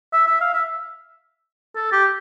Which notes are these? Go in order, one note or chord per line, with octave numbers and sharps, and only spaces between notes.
E5
E5
F5
E5
A4
G4